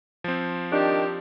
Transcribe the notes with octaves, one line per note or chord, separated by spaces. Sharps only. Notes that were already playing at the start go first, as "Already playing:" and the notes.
F3 C4
D#3 D4 G4